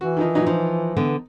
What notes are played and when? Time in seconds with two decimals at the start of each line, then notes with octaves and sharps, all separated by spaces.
0.01 E3 F#4
0.17 D#3 F3 D#4
0.35 A#2 F#3 D#4
0.47 F3 D#4
0.97 D3 B3